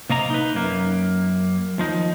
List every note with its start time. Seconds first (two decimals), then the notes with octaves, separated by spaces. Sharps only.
0.10 C3 A#3 D#5 A#5
0.30 D#4 B4
0.55 F#2 A#3
1.78 D#2 F3 D#4